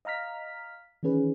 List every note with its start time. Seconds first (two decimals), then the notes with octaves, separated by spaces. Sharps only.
0.05 D#5 F5 A#5 F6 B6
1.03 D#3 E3 C#4 G#4 B4